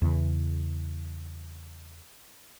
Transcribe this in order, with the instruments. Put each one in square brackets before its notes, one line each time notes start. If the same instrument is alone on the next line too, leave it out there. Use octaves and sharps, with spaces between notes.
[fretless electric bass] E2 C#3 E3